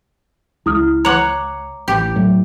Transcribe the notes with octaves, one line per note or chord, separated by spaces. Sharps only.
C#2 E4 D#6 F6
C#5 F#5 A#5 D6
A1 G4
A2 F#3